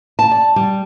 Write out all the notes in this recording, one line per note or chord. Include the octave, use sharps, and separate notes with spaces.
A5
D5
G3